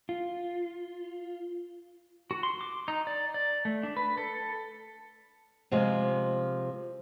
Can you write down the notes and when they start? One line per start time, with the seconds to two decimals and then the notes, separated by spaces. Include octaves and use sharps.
0.09 F4
2.31 F#4
2.43 C6
2.61 D6
2.88 D#4
3.07 D5
3.34 D5
3.65 A3
3.83 D4
3.97 B4
4.18 A4
5.71 C3 F3 G#3